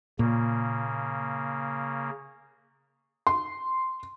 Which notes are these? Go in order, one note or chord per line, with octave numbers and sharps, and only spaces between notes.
A#2 C#3 A#3
C6